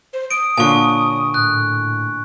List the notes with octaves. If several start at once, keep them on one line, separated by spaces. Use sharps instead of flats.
C5
D#6 D7
A#2 D3 C#5 G#5 C#6
A2 F#6